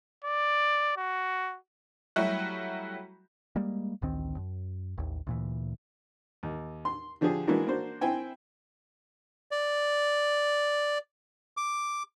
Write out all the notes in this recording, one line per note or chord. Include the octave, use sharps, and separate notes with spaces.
D5
F#4
F#3 G3 A3 E4 F#4
G3 G#3 A#3
A1 D2 D#3 C4
F#2
A1 D#2
D2 A#2 E3
D#2
C6
D3 F3 D4 G4 G#4
E3 G#3 A#3 D4 E4 F#4
A#3 D4 F#4 C5
C4 E4 G5 G#5
D5
D6